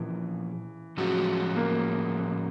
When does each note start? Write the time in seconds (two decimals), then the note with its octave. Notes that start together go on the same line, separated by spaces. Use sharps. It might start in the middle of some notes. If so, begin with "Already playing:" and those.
Already playing: A#2 E3 F3 A#3 C#4 F4
0.97 A2 F3 F#3 G#3 C#4 F#4
1.56 A#3